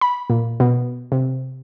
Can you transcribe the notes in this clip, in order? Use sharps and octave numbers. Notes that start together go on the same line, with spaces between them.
B5
A#2
B2
C3